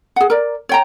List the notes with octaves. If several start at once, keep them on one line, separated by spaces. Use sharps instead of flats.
G#4 F#5
A#4 D5
C#5 G5 A#5